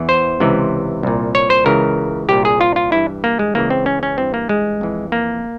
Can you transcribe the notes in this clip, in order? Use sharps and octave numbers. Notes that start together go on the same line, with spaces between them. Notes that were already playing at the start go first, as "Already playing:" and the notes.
Already playing: E2 E3
C5
C#2 C3 E3
C2 A#2
C#5
C5
C#2 C#3 E3 A#4
C2 A#2 G4
G#4
F4
F4
G2 E3 E4
A#3
G#3
C#2 C#3 E3 A#3
C4
C#4
C#4
G2 E3 C4
A#3
G#3
F2 E3
A#3